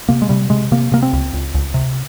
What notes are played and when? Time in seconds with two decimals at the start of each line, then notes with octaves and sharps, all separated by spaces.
0.09 C3 A#3
0.22 G#3
0.29 C3 G3
0.50 C3 G#3
0.72 C3 A#3
0.92 C3 A#3
1.02 C4
1.13 C#2
1.33 C#2
1.54 C#2
1.74 C3